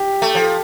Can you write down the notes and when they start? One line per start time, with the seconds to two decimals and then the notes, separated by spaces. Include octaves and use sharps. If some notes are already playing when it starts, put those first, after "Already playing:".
Already playing: G4
0.22 A3
0.35 F3